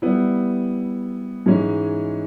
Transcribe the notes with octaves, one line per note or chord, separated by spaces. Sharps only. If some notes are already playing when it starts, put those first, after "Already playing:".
G3 B3 E4
G#2 E3 G#3 C#4